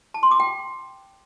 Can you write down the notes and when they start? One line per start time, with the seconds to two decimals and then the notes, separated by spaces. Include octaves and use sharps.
0.14 A5
0.23 C6
0.31 D6
0.40 G5